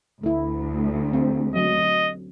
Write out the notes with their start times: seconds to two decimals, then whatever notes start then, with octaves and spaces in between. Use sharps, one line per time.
0.23 D2 A3 E4
1.13 C4
1.56 F#3 D#5